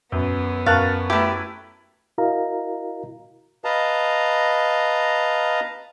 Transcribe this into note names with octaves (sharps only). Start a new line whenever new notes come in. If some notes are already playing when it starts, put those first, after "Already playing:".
F#2 B3
F#2 A#4 F5 A5 C#6 F#6
A3 E4 G4 B4
E4 F#4 A#4 D#5 F5 A#5
B4 D#5 F5 A5 A#5